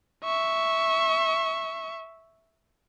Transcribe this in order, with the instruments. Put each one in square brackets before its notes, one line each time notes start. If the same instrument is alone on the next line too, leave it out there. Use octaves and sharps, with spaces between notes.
[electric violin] E5 C#6